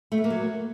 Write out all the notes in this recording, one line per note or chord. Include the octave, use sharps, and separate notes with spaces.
A3
B3
A#3
F#3